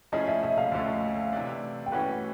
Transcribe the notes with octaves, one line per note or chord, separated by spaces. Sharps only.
F3 A3 C#4 E4 G#4 D#5
E5
E5
F5
D2 D3 F3 A3 C#4
C3 E3 A3 D4
G5
E3 A3 C#4 F#4 B4 F#5